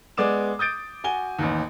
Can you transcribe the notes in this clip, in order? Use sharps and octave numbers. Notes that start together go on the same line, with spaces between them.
G#3 B3 D5 D6 E7
D#6 G6 A6 D7
F#4 G#5 G7
A1 D#2